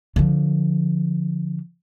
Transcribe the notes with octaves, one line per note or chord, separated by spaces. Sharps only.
D3 F3